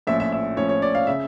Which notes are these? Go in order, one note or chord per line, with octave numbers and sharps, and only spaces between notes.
A#1 A2 F3 C#4 E5
E5
E5
A#1 A2 F3 C#4 C#5
C#5
D5
F5
C#3 E5